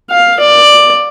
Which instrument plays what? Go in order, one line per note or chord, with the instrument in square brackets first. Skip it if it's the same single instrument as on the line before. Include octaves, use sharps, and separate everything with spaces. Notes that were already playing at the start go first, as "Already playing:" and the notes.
[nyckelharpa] F5
D5